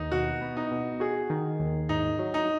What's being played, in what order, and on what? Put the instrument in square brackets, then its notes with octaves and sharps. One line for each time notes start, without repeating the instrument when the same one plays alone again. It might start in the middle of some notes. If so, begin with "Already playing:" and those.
Already playing: [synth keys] D#2 [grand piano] D#4
[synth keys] B2 [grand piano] F#4
[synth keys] B3
[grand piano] D#4
[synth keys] B2
[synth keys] F#4 [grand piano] G#4
[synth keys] D#3
D#2
[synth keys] G#2 [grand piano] D#4
[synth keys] F#3
[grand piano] D#4